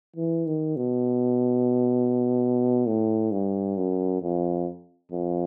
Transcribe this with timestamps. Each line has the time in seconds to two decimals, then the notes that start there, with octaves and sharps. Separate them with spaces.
0.17 E3
0.47 D#3
0.76 B2
2.87 A2
3.32 G2
3.77 F#2
4.22 F2
5.12 F2